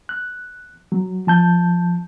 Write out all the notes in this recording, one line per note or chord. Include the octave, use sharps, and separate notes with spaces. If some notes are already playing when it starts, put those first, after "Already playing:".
F#6
F#3
F3 A5 G6